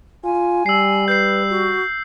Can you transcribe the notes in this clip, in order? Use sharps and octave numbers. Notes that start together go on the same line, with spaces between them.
F4 G#5
G3 E6 C7
B4 G6 C7
F#4